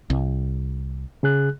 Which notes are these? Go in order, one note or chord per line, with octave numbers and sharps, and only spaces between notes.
C2
C#3 G#4 F#6